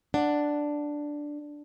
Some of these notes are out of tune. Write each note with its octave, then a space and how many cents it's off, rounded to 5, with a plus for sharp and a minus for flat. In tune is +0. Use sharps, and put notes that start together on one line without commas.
D4 +0 F#5 +0